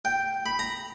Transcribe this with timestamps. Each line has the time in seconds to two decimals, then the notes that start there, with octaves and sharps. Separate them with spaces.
0.05 G5
0.46 B5
0.59 A#5